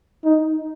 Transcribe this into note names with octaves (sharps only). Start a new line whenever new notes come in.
D#4